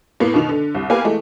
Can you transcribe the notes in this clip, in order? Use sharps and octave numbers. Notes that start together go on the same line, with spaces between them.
A2 A#3 B3
B2 D#3 F7
D3
C2
A#3 B3 G4 B4 F5 G#5
E3 G#3 A3